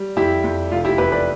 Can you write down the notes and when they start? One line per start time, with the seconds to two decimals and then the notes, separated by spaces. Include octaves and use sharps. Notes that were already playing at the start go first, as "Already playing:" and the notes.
Already playing: G3
0.17 F2 E4 G4
0.44 F2
0.71 F1 F4
0.85 E4 G4
0.98 E2 G4 B4
1.12 B4 D5